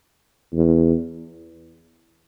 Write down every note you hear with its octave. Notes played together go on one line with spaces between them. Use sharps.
E2